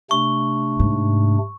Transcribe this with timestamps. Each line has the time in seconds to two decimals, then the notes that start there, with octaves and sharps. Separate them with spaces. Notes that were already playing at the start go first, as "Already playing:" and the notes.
0.11 C3 A3 D4 C#6
0.79 G#2